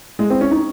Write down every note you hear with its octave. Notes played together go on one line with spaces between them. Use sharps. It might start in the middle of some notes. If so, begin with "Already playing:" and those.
G#3
C4
C#4
D#4